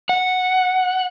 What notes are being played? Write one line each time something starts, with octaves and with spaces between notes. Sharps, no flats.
F#5